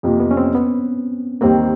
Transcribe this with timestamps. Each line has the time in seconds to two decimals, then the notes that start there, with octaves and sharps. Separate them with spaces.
0.03 F2 C3 F3 A#3
0.20 B3
0.31 C#4
0.37 C4
0.55 B3
1.41 D#2 D#3 G3 A#3 C4